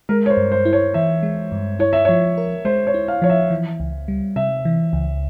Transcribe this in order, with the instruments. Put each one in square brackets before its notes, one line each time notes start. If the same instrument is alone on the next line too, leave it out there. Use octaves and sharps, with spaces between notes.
[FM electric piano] G#3 [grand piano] A#4
[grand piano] C#5
C5
[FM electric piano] G2
[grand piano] C5
[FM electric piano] E4
[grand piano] C#5
[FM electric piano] E3 [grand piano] E5
[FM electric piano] G#3
G2
[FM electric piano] E4 [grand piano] C#5
[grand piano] E5
[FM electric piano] F3 [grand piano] C#5
[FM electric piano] A#4
[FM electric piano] G#3 [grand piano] C5
[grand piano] C#5
[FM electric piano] E4
[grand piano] F5
[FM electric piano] F3 [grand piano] C#5
[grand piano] E5
[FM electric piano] E3
C#2
G3
[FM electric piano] C3 [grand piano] E5
[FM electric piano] E3
C#2